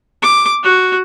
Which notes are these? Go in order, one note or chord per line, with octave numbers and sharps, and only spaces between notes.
D6
F#4